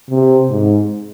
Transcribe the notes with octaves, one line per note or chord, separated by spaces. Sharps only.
C3
G#2